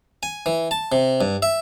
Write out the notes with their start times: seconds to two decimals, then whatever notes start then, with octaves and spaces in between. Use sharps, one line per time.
0.23 G#5
0.46 E3
0.71 A5
0.92 C3
1.21 G2
1.42 E5